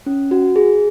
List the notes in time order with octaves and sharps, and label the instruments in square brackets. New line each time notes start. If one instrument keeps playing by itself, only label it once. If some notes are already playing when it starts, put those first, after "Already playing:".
[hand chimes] C#4
F#4
G#4